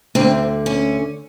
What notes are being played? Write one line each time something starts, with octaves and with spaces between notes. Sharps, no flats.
D2 D3 C4
C#4